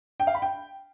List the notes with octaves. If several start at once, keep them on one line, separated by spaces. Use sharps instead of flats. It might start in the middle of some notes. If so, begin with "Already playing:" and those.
G5
F5
B5
G5